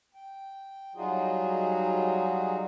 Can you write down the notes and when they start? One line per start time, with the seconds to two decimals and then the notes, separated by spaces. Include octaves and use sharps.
0.15 G5
0.96 F#3 G3 D#4 F4 F#4 G#4